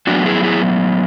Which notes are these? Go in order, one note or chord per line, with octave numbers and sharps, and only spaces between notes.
A2 F#3 B3 D4 F#4
E4 G#4
E4 G#4